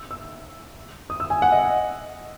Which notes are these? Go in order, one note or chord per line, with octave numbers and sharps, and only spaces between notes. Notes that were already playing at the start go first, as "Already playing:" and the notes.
Already playing: E6
E6
D#6
E6
G#5
F#5
D#5